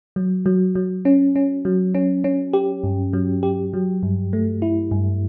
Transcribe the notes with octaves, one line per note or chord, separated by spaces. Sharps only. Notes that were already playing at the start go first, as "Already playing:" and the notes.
F#3
F#3
F#3
C#4
C#4
F#3
C#4
C#4
G4
G2
F#3
G4
F#3
G2
A3
E4
G2